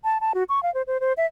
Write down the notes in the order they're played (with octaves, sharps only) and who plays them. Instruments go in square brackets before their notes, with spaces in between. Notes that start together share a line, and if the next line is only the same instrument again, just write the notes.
[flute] A5
A5
F#4
C#6
F5
C5
C5
C5
E5